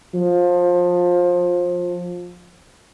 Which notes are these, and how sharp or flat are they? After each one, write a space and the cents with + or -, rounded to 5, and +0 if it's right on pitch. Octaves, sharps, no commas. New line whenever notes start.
F3 +20